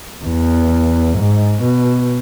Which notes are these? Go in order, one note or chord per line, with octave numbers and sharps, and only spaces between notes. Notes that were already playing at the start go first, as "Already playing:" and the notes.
E2
G#2
B2